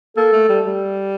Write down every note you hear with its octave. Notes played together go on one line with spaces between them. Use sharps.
A#3 A4
A3
G3
G3